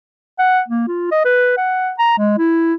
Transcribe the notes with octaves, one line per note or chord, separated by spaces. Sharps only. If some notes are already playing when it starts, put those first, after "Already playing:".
F#5
A#3
F4
D#5
B4
F#5
A#5
G#3
E4